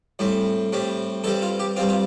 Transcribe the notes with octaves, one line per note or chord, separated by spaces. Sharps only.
A2 G3 C4
A2 G3 C4
G2 G3 C4 A4
F4
G4
G2 G3 C4 F4
F4